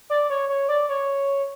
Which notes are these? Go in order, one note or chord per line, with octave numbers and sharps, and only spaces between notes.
D5
C#5
C#5
D5
C#5